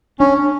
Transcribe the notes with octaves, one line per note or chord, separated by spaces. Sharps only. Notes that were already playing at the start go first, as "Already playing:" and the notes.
C#4 D4